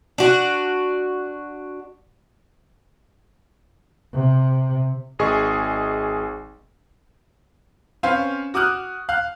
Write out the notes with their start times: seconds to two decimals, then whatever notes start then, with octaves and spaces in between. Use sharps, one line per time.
0.18 D4 F#4
4.13 C3
5.19 G#1 G#4 D#5 C#6
8.03 C4 C#4 B4 C5 F5
8.54 F#4 D6 D#6 F6 F#6
9.09 F5 F6 F#6